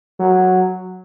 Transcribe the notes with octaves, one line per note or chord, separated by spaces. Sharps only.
F#3